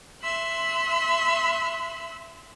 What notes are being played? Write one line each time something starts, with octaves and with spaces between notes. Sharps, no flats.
E5 C6 E6 F#6